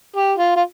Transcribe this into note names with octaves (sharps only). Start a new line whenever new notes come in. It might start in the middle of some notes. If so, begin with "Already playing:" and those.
G4
F4
F4